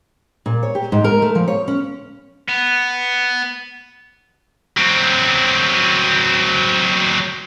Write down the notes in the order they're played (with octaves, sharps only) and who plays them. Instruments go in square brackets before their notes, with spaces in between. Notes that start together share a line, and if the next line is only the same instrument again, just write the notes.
[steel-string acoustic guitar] A#2
C#5
G4
G#2
A#4
A3
F3
C#5
C#4
[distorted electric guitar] B3
F#3 C4